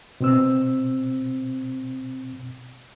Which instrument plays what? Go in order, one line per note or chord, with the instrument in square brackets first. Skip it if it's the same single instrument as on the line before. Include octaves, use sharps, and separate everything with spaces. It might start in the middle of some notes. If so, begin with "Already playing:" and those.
[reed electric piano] B2 C4 E6